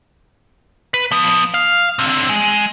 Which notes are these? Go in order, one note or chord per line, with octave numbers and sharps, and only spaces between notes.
B4
F3 B3
F5
D3 C4
G#3